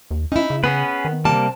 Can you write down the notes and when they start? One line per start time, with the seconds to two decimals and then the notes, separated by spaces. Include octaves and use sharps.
0.11 D#2
0.32 C#4 D#4 E4
0.50 C#3
0.64 B3 C#4 G#4 B4
1.05 D#3
1.25 C3 G3 A#3 A5